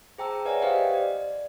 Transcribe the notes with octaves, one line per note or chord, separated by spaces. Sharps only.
G#4 C5 G5 A5 A#5 E6
B4 C#5 D5 E5 F#5 G#5
G4 B4 C5 D#5 F5 G5
D5